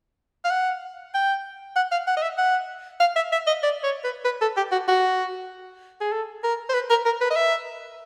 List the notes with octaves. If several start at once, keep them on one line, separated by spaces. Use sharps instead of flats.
F5
F#5
G5
F#5
F5
F#5
D#5
E5
F#5
F5
E5
E5
D#5
D5
C#5
B4
B4
A4
G4
F#4
F#4
G#4
A4
A#4
C5
B4
A#4
A#4
B4
D#5
E5